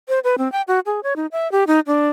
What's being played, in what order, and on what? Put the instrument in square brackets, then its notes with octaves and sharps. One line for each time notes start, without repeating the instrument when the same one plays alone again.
[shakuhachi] C5
B4
C4
G5
F#4
G#4
C#5
D#4
E5
G4
D#4
D4